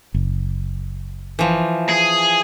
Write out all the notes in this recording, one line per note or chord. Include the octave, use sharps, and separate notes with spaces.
F#1
E3 F3
G#4